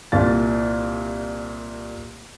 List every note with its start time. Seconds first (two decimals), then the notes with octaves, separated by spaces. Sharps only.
0.12 C2 A#2 A6